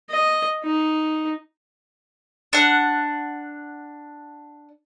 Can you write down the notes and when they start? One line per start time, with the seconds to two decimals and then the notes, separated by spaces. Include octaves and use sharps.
0.10 D#5
0.64 D#4
2.53 D4 F#5